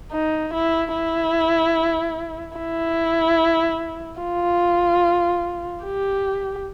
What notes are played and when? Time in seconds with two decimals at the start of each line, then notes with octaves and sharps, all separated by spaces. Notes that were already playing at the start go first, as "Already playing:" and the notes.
0.12 D#4
0.53 E4
0.94 E4
2.57 E4
4.21 F4
5.84 G4